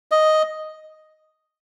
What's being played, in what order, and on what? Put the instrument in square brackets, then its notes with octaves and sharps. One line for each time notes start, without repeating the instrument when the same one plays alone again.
[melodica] D#5